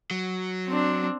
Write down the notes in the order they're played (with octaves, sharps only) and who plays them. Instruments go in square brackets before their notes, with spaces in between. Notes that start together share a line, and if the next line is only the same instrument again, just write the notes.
[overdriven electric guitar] F#3
[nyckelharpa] C4 D4